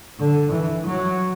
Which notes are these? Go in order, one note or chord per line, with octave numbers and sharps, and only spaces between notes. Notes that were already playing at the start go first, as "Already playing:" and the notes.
D3
E3
F#3